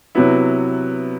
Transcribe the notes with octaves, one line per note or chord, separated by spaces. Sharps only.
C3 F#3 B3 E4